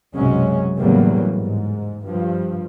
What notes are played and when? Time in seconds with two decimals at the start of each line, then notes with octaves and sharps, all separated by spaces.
0.14 B1 F#2 C3 F#3 G#3 C#4
0.79 E2 A2 C#3 F#3 G3 A#3
1.35 G#2
2.05 G2 F3